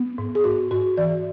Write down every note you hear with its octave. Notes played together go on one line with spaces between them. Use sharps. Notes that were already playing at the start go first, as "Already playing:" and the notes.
Already playing: B3
G#2
G#4
G#2 F#4
G#2 F#4
E3 D5